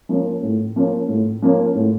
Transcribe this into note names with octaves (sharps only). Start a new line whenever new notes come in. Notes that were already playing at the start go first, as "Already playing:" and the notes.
F3 A#3 C#4
A2
F3 A#3 C#4
A2
F3 A#3 C#4
A2